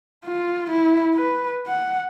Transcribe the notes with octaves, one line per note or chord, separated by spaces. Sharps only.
F4
E4
B4
F#5